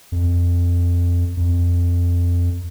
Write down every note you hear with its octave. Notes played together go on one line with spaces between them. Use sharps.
F2
F2